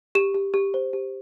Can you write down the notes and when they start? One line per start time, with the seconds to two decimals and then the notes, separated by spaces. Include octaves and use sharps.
0.15 G4 E7
0.35 G4
0.54 G4
0.74 C5
0.93 G4